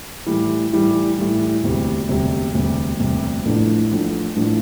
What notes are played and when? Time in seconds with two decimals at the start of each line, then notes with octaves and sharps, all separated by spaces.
0.26 A2 E3 G3
0.72 A2 E3 G3
1.18 A2 E3 G3
1.63 E1 D2 C3 G3
2.09 E1 D2 C3 G3
2.54 E1 D2 C3 G3
3.00 E1 D2 C3 G3
3.45 A1 A2 F3 A3 D4
3.91 A1 A2 F3 A3 D4
4.36 A1 A2 F3 A3 D4